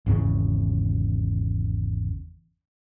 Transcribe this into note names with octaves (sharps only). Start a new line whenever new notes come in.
G#1 E2 C#3